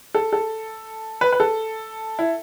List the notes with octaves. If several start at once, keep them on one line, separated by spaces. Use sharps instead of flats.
A4
A4
B4
B4
A4
E4